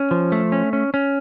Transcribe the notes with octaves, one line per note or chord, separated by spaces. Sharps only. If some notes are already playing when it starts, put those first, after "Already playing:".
Already playing: C#4
F3
A3
C#4
C#4
C#4